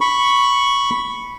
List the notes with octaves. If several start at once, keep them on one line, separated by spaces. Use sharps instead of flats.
B5 C#6